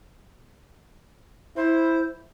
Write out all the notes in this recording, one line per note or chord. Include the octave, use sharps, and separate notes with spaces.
E4 C5